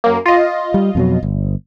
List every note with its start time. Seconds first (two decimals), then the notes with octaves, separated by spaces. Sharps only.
0.04 F#2 A#3
0.26 F4 D#5
0.74 G3
0.95 F2 B2 F#3
1.23 G1